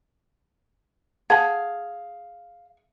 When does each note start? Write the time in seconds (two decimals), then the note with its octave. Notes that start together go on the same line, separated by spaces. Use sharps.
1.30 G#4 F5 F#5 A5